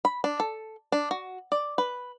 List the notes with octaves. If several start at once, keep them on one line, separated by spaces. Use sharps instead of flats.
B5
D4
A4
D4
F#4
D5
B4